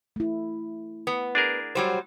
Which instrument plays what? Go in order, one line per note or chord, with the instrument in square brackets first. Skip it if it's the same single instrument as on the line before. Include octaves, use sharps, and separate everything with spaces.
[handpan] A3 E4
[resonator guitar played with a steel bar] B3
[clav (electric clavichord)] D4 G#4 A#4
[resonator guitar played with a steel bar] F#3 G3 C5